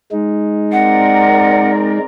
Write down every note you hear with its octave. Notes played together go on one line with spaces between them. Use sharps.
G#3 D#4
C4 A#4 D5 F#5